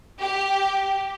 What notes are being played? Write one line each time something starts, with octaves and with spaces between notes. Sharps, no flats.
G4